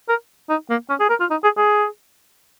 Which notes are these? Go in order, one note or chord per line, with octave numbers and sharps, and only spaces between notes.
A#4
D#4
A#3
C#4
G#4
A#4
F4
D#4
G#4
G#4